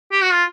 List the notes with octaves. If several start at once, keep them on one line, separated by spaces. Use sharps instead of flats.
G4
F#4
F4